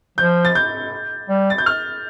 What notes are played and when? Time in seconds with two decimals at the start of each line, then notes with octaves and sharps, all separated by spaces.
0.18 F3 G6
0.45 A6
0.55 G6
1.29 G3
1.50 A6
1.58 G6
1.66 F6